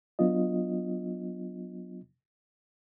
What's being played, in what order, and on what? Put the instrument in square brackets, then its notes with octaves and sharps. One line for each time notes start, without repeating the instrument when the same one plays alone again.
[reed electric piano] F#3 B3 D4 F4 D#5